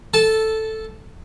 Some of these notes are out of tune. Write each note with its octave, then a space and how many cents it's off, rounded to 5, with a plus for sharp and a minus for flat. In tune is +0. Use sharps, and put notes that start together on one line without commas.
A4 +0 A5 -15